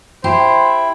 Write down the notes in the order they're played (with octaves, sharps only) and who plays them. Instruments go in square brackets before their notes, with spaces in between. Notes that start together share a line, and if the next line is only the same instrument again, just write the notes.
[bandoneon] E4 [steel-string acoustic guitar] G4 [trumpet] C5